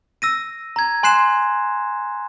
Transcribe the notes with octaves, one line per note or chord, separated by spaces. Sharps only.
E6 A#6 D#7
A#5 G#6
G#5 C6 F#6 C7 E7